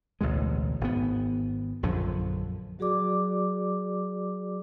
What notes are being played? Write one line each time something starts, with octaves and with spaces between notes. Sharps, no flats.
A1 D2 B2 G#3
G#1 B3
A#1 F#2 D3 F3
F#3 F#4 G#4 D5 D6